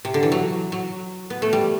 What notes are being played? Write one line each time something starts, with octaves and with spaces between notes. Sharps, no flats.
C3
D3
E3
F#3
F#3
B3
A3
G3